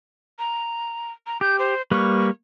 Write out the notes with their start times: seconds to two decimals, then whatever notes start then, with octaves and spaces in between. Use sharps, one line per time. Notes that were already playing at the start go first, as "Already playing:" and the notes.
0.39 A#5
1.27 A#5
1.41 G4 G6
1.59 C5
1.91 G3 A#3 B4 C#6